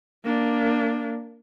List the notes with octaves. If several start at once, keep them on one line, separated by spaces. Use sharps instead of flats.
A#3 D4